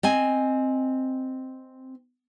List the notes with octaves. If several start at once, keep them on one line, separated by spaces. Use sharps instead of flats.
C4 D#5 G#5